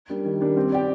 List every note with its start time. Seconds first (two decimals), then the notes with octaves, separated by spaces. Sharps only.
0.10 G3 A#3 D4
0.25 D#3
0.41 G3 A#3 D4
0.57 C4
0.72 G4 D5